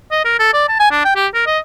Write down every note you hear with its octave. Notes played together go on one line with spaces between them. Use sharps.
D#5
A#4
A4
D5
A5
G#5
D4
G5
G4
A#4
D#5